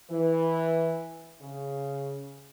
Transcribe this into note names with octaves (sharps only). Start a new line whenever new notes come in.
E3
C#3